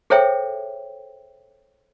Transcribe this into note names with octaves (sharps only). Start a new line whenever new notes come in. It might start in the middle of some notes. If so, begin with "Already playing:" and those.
G#4 A4 C5 C#5 E5 G5